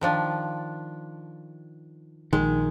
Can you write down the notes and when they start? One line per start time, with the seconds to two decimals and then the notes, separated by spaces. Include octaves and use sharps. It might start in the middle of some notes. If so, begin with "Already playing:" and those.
0.01 D#3 F3 D4
2.33 A#1 D#3 G#3